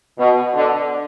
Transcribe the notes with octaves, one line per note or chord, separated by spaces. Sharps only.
B2
D3